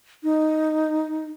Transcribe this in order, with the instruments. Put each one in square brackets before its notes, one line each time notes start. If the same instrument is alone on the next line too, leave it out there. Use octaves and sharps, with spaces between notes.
[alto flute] D#4